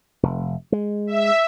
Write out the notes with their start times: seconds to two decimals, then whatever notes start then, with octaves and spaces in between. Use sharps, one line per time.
0.23 F1
0.72 G#3
1.07 E5